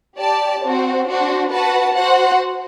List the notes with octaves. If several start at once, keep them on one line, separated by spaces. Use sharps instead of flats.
G4 D5 A5
C4 F#4 C5
D4 F#4 C5
F#4 B4 F#5 A5
F#4 C5 F#5